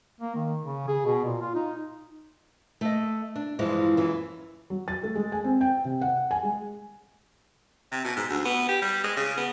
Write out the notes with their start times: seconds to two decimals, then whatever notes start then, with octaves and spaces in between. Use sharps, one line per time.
0.20 A#3
0.35 D#3
0.63 C#3
0.88 G#4
1.06 B2
1.25 A#2
1.41 F4
1.55 D#4
2.81 A3 D#5
3.36 D4
3.59 G2 E3 F3 G#3
3.97 F#2 E3
4.70 F#3
4.88 A6
5.03 A3
5.15 G#3
5.32 G#5
5.44 C4
5.61 G5
5.85 C3
6.01 F#5
6.31 G#5
6.43 G#3
7.92 C3
8.04 B2
8.16 G#2
8.30 D2
8.45 B3
8.69 G4
8.82 G3
9.04 G#3
9.17 C#3
9.37 B3